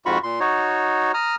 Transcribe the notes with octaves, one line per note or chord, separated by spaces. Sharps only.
F2 G#2 F4 F#4 B5 C#6
A#2 C6
D#4 F#4 C#5
A#5 D#6 F6